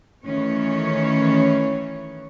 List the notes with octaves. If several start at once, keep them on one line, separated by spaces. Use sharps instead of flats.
D#3 E3 A3 C#4 C#5